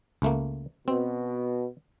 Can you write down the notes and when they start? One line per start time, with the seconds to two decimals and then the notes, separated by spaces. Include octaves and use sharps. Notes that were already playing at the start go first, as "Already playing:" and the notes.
0.22 C#2 A3 A#3
0.88 B2 C4